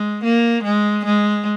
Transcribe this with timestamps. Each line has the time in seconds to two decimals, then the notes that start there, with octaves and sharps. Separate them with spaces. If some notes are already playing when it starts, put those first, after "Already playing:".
Already playing: G#3
0.24 A#3
0.63 G#3
1.05 G#3